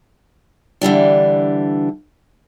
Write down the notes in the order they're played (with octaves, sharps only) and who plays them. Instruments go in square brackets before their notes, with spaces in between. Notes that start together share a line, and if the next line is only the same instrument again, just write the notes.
[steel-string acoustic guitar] D3 E3 G3 D4